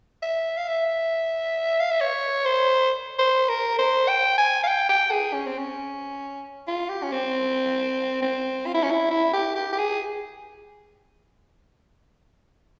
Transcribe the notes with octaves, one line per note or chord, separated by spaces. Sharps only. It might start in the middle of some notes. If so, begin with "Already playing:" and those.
E5
F5
E5
F5
E5
C#5
C5
C5
A#4
C5
G5
G#5
F5
G5
G5
G#4
C#4
C4
C#4
F4
G4
C#4
C4
C4
F4
E4
C#4
E4
E4
G4
G4
G4
G#4